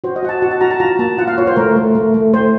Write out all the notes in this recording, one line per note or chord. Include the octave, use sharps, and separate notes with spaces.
F#4 C5
D#5
F#4 F#5
A5
F#4 F#5
A5
F#4 A#5
A5
F4 A#5
A#3 A5
F4 F#5
F5
F4 C#5
C5
A3 A#4
A3
A3
A3
A3 C5